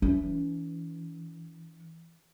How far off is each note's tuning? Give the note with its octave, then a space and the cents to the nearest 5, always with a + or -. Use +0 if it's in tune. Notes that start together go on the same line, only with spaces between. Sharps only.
E3 -5 C#4 +40